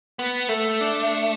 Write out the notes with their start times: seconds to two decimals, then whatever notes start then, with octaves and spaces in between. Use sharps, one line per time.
0.19 B3 B4
0.49 A3 A4
0.81 D4